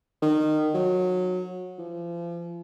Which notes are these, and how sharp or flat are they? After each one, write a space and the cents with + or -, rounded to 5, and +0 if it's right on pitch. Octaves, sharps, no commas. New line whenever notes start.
D#3 -20
F#3 -20
F3 -35